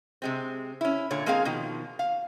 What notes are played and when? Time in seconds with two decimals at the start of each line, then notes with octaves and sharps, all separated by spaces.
0.22 C3 G#3 C4
0.81 C#4 E4
1.11 A#2 D3 C#5
1.26 G#3 A#3 C4 G#4 F5
1.45 B2 D#3 F3
1.99 F5